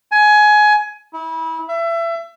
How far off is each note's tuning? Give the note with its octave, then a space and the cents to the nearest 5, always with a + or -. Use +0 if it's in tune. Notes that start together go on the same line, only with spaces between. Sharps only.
G#5 +20
E4 -30
E5 +30